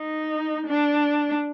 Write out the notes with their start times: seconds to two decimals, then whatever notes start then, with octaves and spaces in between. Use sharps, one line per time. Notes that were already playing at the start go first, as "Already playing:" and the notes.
Already playing: D#4
0.67 D4